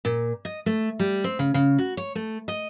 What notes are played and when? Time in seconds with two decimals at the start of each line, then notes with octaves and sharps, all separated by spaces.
0.05 A#2
0.45 D#5
0.66 A3
1.00 G3
1.24 C4
1.39 C#3
1.54 C#3
1.78 F#4
1.97 C#5
2.15 A3
2.48 D#5